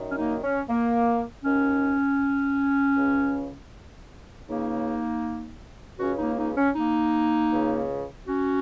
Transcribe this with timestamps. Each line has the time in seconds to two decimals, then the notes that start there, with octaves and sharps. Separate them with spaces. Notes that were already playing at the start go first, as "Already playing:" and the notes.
Already playing: F#2 D#3
0.12 C#4
0.18 A#3 D#4
0.43 C#4
0.68 A#3
1.44 D#2 D#3 C#4
2.96 C#2 C#3
4.48 C#2 C#3 A#3 D#4
5.99 C#2 C#3 C#4 F#4
6.18 A#3 D#4
6.38 A#3 D#4
6.57 C#4
6.75 A#3 D#4
7.52 C#2 C#3
8.27 C#4 F#4